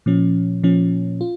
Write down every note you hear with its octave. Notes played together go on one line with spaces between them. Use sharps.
A#2 F3 C#4
A#2 F3 C#4
F4